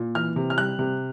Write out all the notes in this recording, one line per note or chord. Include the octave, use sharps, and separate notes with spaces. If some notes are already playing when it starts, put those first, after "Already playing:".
Already playing: A#2
E3 F6
C3
F6
G3 F#6
C3